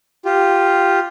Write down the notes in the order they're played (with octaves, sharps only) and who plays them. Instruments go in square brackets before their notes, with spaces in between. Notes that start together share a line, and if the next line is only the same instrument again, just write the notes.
[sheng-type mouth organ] F4 G4